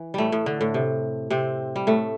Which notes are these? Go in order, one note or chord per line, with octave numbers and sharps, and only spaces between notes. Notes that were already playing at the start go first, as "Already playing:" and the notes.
Already playing: E3
A2 G3 A3
A2
D3
A2
C3
C3 C4
G3
A2 A3